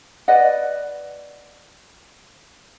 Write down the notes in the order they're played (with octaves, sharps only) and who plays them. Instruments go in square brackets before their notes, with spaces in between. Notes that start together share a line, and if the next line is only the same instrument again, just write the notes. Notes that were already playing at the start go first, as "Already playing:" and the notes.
[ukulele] B4 D5 D#5 F#5